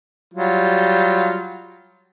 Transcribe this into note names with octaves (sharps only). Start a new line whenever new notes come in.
F#3 G3 F4